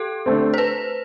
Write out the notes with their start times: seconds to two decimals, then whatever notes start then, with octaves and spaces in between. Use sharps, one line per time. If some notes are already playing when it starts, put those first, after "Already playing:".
Already playing: G4 A4
0.26 D3 A3 C4
0.54 C5
0.58 B4